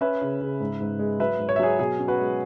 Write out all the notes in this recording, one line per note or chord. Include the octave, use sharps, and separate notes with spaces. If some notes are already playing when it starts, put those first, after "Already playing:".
C#4 B4 E5
C#3
C#3
G#2
G#2
G#3
F#3 B4 E5
G#2
C#5
E5
F#3 G#4 C#5
B2 G#4
C#4
F#4 B4
G#3